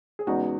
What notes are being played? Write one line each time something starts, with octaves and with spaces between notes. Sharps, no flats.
G#4
E2 C#3 G#3 B3 D#4 F#4